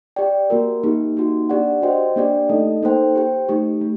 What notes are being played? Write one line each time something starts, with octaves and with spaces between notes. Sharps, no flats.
G4 D5 G5
A#3 F#4 A#4
A#3 D#4 G4
A#3 D#4 F#4
D4 G4 D5 F#5
F#4 C5 D#5 G5
A#3 D4 G4 D5 G5
A3 D#4 A4 D#5
A#3 D#4 A4 C5 G5
G4 C5 G5
A3 D#4 G4
A3